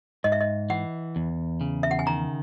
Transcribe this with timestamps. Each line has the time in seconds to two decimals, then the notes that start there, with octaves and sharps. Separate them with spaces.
0.24 G#2 D#5
0.32 E5
0.40 D#5
0.70 E3 F#5
1.16 E2
1.61 C#3
1.83 E5
1.91 F#5
1.99 G#5
2.07 D#3 A#5